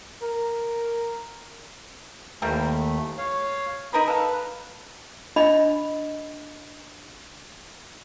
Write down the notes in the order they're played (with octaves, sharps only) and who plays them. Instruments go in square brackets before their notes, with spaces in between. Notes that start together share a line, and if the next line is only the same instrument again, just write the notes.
[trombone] A#4
[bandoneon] D#2 A3 [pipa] E3 G3 A#3
[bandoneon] C#5 F5
[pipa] D#4 A#4 B4 [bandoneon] B5 D#6
[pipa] A4 F5 [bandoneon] B4
[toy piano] D4 D#5 B5